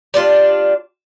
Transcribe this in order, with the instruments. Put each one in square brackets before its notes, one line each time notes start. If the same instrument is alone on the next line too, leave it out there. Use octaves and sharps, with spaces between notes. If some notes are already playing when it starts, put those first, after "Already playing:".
[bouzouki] G3 D4 F4